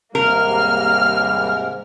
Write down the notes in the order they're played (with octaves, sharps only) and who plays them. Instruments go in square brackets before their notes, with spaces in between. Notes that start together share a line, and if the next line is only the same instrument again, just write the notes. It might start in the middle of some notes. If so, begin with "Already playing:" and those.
[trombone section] D#2 G3 [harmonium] G#2 C3 G#3 [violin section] A#3 F6 [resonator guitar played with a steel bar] A#4